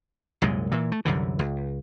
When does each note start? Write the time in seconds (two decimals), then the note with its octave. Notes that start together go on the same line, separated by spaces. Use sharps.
0.42 C2 F#2 A#2 G#3
0.72 A#2 E3
0.92 A3
1.05 C2 F#2 D3 E3
1.39 C#2